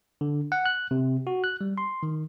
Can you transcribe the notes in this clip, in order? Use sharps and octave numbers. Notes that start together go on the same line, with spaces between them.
D3
F#5
F#6
C3
F#4
F#6
G3
C6
D#3